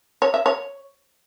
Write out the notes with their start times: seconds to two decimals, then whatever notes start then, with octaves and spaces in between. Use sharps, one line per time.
0.22 C#5
0.34 E5
0.46 C#5